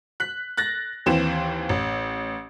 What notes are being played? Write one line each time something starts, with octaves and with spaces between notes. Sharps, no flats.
F#6 B6
F#6 A6 A#6
D#2 E3 C4 E7
A1